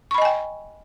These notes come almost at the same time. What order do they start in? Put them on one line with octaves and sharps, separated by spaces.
C#6 B5 D#5 G#5 G5